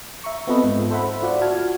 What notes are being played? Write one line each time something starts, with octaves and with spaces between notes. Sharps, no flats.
E5 A#5 C#6
B3 C4 F4 A4 B4 D#5
G#2
A4 C5 E5 F#5 B5
F4 F#4 D5 F#5
F#4 A5 F6 G#6